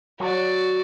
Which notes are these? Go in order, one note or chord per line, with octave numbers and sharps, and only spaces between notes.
F#3 F#4 D5